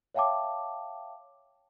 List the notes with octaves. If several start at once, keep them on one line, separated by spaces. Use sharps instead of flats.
C#5 E5 F5 G5 A5 D6